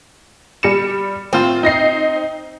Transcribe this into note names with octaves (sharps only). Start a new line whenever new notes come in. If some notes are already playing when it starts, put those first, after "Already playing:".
G3 C#7 E7
A2 C4 F4
D#4 A#6 C7